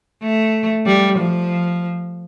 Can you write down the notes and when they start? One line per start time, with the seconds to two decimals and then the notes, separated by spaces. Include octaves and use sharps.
0.22 A3
0.86 G3
1.18 F3